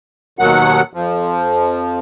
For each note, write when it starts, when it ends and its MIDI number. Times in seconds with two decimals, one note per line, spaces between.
0.39 0.82 39
0.39 0.82 47
0.39 0.82 51
0.39 0.82 54
0.39 0.82 78
0.94 2.00 41
0.94 2.00 53